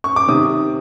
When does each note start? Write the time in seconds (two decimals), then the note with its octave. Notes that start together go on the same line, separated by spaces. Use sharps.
0.04 C#6
0.16 D6
0.27 C3 D#3 D#6